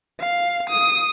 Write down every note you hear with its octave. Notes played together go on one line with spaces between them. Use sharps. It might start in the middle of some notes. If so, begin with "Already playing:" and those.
F5
D#6